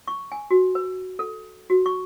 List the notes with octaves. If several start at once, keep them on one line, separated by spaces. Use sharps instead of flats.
C#6
G#5
F#4
B4
A4
F#4
C#6